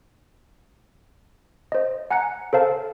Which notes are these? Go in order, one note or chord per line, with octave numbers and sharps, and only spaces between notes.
C5 D#5
F#5 G#5 A#5 F#6 C#7
A4 C5 F5 A5